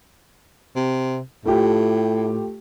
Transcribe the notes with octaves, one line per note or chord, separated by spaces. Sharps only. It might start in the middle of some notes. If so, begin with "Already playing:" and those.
C3
A2 A3 F4 G4